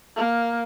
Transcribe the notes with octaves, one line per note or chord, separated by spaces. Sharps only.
A#3